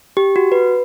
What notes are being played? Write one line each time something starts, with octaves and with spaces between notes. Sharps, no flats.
G4
F#4
B4